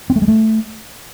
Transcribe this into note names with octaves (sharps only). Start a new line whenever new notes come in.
C4
A3
G#3
A3